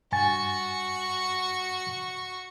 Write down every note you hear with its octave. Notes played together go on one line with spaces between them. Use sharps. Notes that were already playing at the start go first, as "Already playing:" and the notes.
G2 F#4 G#5 C#6 A6